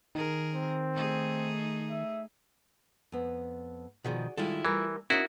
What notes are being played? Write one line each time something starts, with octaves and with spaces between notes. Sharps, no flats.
D#3 G#4 A#4
C4
A3 D#4 G#4
E5
F2 B3
B2 D#3 F3 F#4 G#4 D5
D#3 G3 G#3 E4 F4 A4
E3 G3 A3 A#4
C#4 D#4 E4 F#4 A#4 C#5